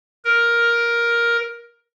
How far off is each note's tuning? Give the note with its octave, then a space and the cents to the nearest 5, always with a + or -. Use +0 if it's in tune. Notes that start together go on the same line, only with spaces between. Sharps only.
A#4 +10